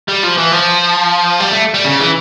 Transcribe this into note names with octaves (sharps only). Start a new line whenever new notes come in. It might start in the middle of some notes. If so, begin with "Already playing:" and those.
G3
F3
E3
F3
G3
A3
G3
C#3
E3